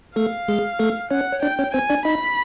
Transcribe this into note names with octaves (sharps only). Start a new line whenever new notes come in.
A3 A4 F5
G#3 G#4
A3 A4
C#4 C#5 F#5
C#5
D4 D5 G5
C#4 C#5
C4 C5 G#5
D4 D5
D#4 D#5 B5